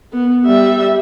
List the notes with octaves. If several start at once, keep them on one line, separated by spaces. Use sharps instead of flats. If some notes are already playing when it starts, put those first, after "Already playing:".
B3
G3 E5